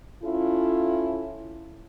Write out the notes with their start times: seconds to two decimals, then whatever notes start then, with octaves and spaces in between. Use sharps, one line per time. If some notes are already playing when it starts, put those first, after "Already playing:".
0.23 C#4 E4 F4 A4